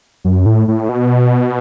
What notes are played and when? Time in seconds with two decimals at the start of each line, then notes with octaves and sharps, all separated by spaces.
0.25 F#2
0.46 A2
0.68 A2
0.89 B2